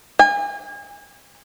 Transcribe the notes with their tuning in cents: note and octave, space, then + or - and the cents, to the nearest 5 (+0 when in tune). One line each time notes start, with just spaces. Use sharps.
G#5 -35